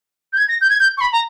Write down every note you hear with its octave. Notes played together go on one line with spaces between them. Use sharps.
G6
G#6
A#6
G6
G#6
G6
C#6
B5
A#5